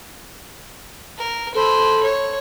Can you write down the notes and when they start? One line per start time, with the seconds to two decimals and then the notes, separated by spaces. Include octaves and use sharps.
1.18 A#4
1.55 A4 C5 B5
2.03 C#5